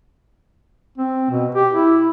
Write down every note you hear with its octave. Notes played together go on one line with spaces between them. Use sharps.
C4
B2
G4
E4